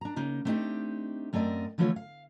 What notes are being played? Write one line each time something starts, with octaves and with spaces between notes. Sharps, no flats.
D4 A#5
C#3 A#3 D#4
A3 B3 C4 D4 D#4 G4
F#2 A3 C4 A#4 D5 D#5
D3 E3 F3 A3 F4 C#5
F5